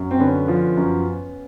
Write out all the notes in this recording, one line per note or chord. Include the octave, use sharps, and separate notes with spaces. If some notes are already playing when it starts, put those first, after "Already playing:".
Already playing: F#2
C4
D3 B3 C#4
F3
F#2